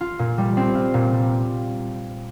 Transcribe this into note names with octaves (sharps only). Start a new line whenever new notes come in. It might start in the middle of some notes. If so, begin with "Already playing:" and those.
F4
A#2
G3
C4
F4
A#2
G3